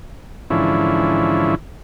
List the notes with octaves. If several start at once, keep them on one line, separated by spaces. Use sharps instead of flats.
G#2 D3 E3 F3 C#4 E4